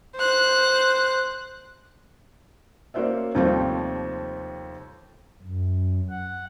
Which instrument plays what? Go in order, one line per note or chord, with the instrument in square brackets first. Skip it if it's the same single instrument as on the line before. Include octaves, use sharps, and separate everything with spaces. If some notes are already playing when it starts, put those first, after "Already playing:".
[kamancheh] C5 F#6
[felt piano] A#3 C#4 F#4 C5 D5 E5
D#2 C3 F3 G3 A3 C4
[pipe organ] F#2
F#5